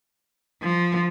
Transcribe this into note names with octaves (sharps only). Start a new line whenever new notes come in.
F3